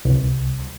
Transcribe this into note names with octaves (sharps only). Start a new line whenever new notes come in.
C2